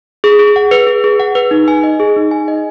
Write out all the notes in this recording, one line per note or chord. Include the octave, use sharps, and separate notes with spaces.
G#4
G#4
F#5
B4
G#4
G#4
F#5
B4
D#4
G#5
D#5
G#4
D#4
G#5
D#5